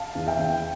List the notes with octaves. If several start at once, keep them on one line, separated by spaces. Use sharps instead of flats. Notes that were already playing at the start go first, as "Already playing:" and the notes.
Already playing: F5 A5
E2
E5 G5
E2